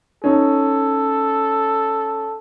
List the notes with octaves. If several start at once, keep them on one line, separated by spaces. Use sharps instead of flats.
C#4 D#4 A4